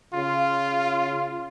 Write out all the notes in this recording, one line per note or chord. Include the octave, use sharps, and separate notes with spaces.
C#3 F4